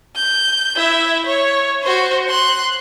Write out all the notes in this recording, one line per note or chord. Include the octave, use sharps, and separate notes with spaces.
G6
E4 E5
C#5
F#4 C5
C6 F#6